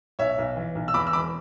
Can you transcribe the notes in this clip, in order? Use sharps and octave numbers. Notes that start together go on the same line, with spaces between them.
B1 C#5 E5
B1
E3
B1
E6
E2 B5 D6
E6
E1 B5 D6